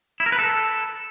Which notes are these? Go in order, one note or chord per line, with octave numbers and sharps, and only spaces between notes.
E4
A#4
B4
A4